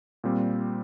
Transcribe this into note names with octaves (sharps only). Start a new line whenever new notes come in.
A#2 G3 C4